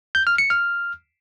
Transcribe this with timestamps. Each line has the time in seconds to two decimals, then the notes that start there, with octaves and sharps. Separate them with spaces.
0.15 G6
0.27 F6
0.38 C#7
0.50 F6